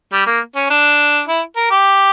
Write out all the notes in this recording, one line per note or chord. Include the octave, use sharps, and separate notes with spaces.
G3
A#3
C#4
D4
E4
A#4
G4